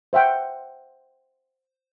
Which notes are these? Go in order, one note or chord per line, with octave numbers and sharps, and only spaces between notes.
C5 E5 F#5 G5